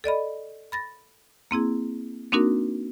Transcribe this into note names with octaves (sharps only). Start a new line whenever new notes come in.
A4 D5 D#5 B5
B5 A6 A#6
A#3 C4 E4 G#4
A#3 C4 D4 D#4 F#4 A#4